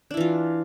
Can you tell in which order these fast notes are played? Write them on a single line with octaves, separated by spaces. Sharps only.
D4 E4 E3 F4